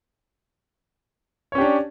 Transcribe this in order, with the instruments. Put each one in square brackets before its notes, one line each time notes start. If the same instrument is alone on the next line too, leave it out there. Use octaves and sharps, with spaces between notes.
[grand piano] C#5
C#4
G4
D4